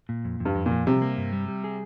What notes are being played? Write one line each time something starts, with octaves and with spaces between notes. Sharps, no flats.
A#2
F2
F2
G2
F2
A#2
F3
C3 G3
A#3
G2
G3
G3
G#4